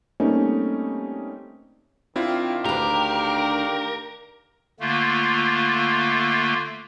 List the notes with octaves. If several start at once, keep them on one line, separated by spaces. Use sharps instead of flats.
G3 A3 A#3 C4 C#4 D#4
D#3 C4 D4 E4 F4 F5
D2 G4 A#4 B4
D3 A3 A#3 F4